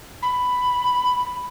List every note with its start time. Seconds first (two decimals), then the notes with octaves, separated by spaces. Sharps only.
0.23 B5